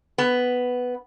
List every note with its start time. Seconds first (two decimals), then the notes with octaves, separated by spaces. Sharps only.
0.18 B3